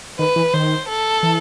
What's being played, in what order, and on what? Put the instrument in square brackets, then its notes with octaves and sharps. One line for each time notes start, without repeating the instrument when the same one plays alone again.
[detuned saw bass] D#3 [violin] B4
[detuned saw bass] E3
[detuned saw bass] D#3 [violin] C5
[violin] A4
[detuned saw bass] E3